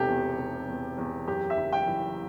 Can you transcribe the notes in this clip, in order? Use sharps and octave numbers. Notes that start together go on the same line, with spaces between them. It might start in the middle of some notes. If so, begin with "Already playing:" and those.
Already playing: E1 C3 G4 A4
E2
C3
E2
E2
F#2 G4
E5
F#1
G5
E3